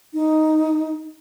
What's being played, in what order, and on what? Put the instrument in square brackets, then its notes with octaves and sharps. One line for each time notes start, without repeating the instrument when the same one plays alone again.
[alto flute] D#4